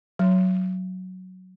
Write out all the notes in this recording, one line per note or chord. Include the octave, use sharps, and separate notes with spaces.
F#3